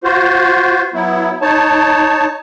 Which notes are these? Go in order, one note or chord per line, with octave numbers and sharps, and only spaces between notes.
F4 F#4 C5
F#3 B3 E4
D#4 C#5 A5